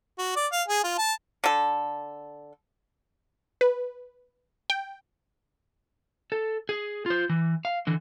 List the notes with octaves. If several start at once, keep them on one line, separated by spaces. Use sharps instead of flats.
F#4
D5
F5
G#4
F4
A5
D3 A4
B4
G5
A4
G#4
F4 C5
E3
F5
D3 E3